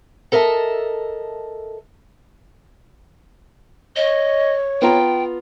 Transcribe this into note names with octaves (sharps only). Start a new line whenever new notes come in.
A4 A#4 D#5 E5 A5
C#5 D#5
B3 F4 G5 A#5